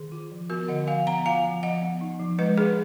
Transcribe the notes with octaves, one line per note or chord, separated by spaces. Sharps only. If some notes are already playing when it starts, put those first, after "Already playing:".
Already playing: D#3 G#4
F4
F3
B3 F#4 A#4
D3 D#5 F#5
F3 F5 G#5
B3 F#5 A#5
F4 F5 G#5
F3
F3 D#5 F#5
B3
D#4
F3
G#3 B4 D#5
D4 G#4 B4